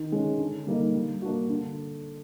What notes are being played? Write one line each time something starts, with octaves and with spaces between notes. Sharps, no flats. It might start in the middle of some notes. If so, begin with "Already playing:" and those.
Already playing: D#3
G#3 C#4
D3
G3 A#3 D#4
G3
A#3 D4 F#4
D3